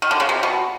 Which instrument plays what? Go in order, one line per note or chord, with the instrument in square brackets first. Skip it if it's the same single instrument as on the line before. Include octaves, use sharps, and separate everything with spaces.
[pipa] D#3
D3
C#3
C3
B2